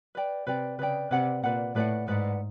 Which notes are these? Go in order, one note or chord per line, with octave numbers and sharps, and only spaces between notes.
B4 D5 G5
C3 B4 D5 G5
C#3 B4 D5 G5
C3 B4 D5 F#5
A#2 B4 D5 F#5
A2 B4 D5 F#5
G#2 B4 D5 F#5